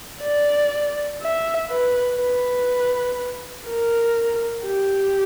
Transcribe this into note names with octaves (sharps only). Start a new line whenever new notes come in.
D5
E5
B4
B4
A#4
G4